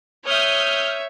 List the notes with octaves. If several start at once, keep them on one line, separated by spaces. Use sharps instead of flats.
C#5 E5 D#6 F6 G6